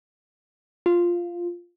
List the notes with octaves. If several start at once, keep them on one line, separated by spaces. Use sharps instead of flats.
F4